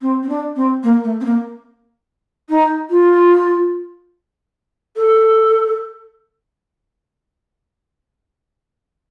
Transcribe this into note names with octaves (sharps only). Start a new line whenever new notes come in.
C4
C4
D4
C4
A#3
A3
C4
A#3
D#4
F4
A4